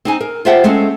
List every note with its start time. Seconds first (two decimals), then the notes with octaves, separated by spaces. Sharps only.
0.05 C4 D#4 G#5
0.21 A#4
0.45 F4 G4 C5 E5 F#5 G5
0.64 G#3 A3 C4 C#4